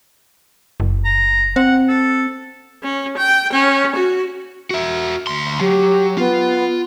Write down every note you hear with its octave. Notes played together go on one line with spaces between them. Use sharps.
F#1
A#5
C4 F#5
A4
C#4
G5
C#4
F#4
F#4 E5
D2 C6
F#3 G4
B3 F4